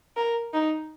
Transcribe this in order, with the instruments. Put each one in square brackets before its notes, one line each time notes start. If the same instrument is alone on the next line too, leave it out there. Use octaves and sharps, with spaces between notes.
[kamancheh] A#4
D#4